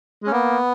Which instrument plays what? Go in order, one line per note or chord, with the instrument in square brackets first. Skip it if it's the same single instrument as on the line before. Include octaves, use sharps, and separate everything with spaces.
[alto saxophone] G#3 [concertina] C#4
[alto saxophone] A#3 [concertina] B3